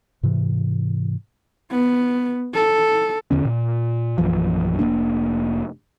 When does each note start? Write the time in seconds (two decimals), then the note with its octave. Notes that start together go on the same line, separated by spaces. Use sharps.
0.23 G#2 C3 E3
1.71 B3
2.54 A4
3.31 E2 D3 C#4
3.45 A#2
4.18 A#1 F#2 E3 F3
4.79 F1 G#2 A#3 D4